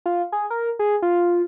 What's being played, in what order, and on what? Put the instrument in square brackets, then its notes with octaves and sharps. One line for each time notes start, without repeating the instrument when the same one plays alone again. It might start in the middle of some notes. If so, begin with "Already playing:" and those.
[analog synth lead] F4
G#4
A#4
G#4
F4